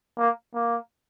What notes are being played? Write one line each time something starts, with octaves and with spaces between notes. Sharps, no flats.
A#3
A#3